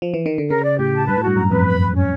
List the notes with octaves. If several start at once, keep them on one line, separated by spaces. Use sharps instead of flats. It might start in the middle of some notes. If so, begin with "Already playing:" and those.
F3
E3
D#3
D3
C#3 A#4
D5
A2 G4
A5
G2 B4
A2
G2 F#4
F#2 A#5
F2 B4
B5
B4
C#4